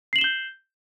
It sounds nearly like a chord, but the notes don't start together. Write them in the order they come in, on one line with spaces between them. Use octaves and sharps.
C7 F#7 E7 G7 G6